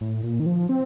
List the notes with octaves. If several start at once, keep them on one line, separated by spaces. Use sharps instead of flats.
A2
A#2
D#3
F3
C4